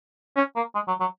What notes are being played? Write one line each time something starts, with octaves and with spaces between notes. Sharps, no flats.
C#4
A#3
G#3
F#3
F#3